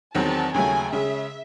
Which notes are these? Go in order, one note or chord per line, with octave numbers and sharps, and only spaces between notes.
E2 D#3 F#3 C4 A5
D#2 C#3 F#3 A3 G#5
C#3 G#3 C#4 E5